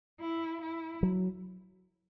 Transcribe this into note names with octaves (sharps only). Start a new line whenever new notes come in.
E4
E4
F#3